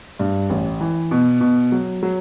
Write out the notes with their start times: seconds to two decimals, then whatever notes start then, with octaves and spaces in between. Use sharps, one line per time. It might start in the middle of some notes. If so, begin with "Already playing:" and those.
0.19 G2
0.50 A1
0.81 E3
1.11 B2
1.41 B2
1.72 F#3
2.03 F#3